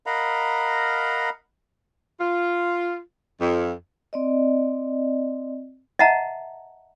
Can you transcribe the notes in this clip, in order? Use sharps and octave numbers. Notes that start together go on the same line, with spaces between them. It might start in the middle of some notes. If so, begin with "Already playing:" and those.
A#4 D#5 F5 F#5 A#5 B5
F4
F2
C4 D5 D#5
D#5 E5 F#5 A5 A#5